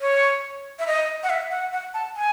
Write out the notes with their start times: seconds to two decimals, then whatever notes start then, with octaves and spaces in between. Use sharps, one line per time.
0.01 C#5
0.79 E5
0.87 D#5
1.23 F#5
1.30 E5
1.51 F#5
1.73 F#5
1.94 A5
2.16 G#5